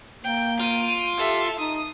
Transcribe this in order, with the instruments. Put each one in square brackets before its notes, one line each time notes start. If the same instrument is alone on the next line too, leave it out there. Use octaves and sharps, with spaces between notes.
[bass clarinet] A#3 [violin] G5
[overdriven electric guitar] F4 [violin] D7 D#7
[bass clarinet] G4 [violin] A4 E5
[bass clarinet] D#4 [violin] D#6